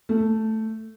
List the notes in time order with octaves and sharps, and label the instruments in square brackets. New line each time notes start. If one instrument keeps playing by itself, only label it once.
[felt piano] A3